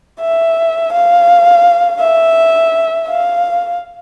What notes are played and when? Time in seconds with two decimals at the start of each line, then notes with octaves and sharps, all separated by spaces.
0.20 E5
0.92 F5
2.00 E5
3.08 F5